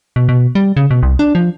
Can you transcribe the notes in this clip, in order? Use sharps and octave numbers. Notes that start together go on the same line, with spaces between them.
B2
B2
G3
C#3
B2
C2
D4
F3